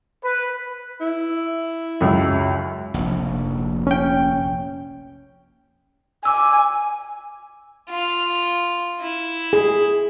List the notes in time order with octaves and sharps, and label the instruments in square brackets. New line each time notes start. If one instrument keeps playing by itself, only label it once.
[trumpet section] B4
[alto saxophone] E4
[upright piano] C#2 F#2
[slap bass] F1 A#1
[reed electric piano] C#4 G5
[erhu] G#5 [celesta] D6 E6
[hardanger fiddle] F4
E4
[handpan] G#4